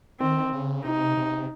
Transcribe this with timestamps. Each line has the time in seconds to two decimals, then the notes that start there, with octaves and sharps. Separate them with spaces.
0.20 D#3 C4
0.53 C#3
0.85 C3 D#4
1.17 C3